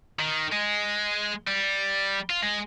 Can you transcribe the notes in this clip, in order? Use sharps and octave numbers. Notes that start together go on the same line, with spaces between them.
D#3
G#3
G3
F4
G#3